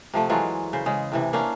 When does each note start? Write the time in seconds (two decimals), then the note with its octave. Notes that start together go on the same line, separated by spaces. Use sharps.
0.14 C3 F3 A3
0.29 E3 F#3 G#3 F4
0.73 C#3 C5
0.86 C#3 G#3
1.12 A2 C3 E3
1.33 A#3 C#4 D4